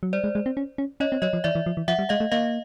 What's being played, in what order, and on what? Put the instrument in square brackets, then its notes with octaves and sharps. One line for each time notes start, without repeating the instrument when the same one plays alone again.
[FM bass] F#3
[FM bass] G3 [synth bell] C5 D5
[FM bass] G#3
G#3
C4
C#4
C#4
[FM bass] C#4 [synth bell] C#5 D#5
[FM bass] C4
[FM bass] F#3 [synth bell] C#5 D#5
[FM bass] F3
[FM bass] E3 [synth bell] D5 E5
[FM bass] E3
F3
E3
[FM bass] F3 [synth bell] E5 F#5
[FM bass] G3
[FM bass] G#3 [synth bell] D#5 F5
[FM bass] A3
[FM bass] A#3 [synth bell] D#5 F5